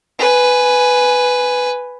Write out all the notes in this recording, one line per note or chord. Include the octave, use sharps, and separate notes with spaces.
B4 G#5